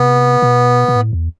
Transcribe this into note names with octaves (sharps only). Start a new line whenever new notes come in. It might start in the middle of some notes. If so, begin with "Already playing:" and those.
Already playing: C3 B3
B2
B2
A2
E2